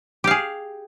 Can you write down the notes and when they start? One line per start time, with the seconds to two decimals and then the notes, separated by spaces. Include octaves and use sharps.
0.24 G4
0.27 F5
0.31 G#4